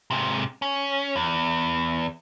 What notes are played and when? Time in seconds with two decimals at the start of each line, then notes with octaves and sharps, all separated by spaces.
0.11 G#2 C3
0.62 C#4
1.16 E2